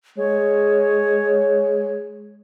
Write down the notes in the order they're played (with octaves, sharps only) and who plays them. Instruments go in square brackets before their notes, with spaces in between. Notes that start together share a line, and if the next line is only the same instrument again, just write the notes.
[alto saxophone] G#3 [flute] C#5